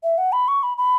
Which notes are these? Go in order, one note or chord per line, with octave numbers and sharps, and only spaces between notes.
E5
F#5
B5
C#6
B5
B5